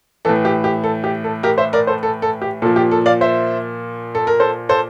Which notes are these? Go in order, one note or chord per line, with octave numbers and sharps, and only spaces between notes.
A2 E3 A4
G4
G4
A4
G4
A4
G4 A#4
C5 E5
A#4 D5
A4 C5
A4
A4
G4
A#2 F3 A4
G4
A4
D5 F5
C5 E5
A4
A#4
A4 C5
A4 C5